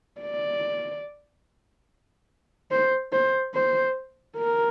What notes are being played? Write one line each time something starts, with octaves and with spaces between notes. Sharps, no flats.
D5
C5
C5
C5
A#4